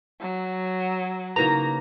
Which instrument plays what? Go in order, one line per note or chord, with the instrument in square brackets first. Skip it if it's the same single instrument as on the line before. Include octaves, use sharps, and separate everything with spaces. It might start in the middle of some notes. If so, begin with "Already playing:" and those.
[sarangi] F#3
[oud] C#3 A#3 B4 [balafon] D#4 E4 F#4 [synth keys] A#5